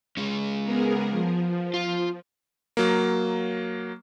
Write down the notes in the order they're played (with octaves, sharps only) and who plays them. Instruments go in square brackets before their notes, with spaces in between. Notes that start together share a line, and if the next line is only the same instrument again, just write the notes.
[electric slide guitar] G#3 C#4
[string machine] B3 G#4 A#4
F3
[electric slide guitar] F4
[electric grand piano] F#3 A#3